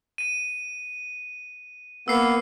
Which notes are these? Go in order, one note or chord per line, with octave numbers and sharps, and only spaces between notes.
D#7
A#3 B3 E6 C7